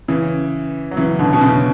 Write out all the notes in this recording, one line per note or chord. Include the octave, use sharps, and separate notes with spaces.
C#3 E3
F#3
C#3 E3
B2 D3
B2
C#3